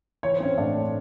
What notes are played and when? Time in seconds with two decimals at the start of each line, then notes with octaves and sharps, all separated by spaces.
0.23 E3 C#5
0.33 C5
0.40 C4 C#4 C#5
0.58 A2 D4 D5
0.74 A3